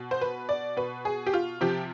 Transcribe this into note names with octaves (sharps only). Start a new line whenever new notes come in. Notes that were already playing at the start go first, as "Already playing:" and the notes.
Already playing: B2
C5
B4
D5
B2 B4
G#4
G4
F4
C3 F3 G4